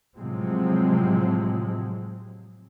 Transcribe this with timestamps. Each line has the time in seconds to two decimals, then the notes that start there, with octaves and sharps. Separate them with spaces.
0.17 A2 C3 F3 F#3 G#3 C4